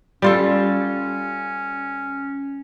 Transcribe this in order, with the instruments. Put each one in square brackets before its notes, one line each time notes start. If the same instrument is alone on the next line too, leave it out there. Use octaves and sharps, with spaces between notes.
[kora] G3 F4 A4 [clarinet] C#4